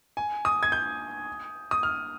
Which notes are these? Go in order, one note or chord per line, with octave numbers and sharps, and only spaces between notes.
G#5
D#6
G#6
G6
D#6
F6